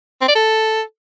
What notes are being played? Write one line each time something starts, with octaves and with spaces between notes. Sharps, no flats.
C4
D5
A4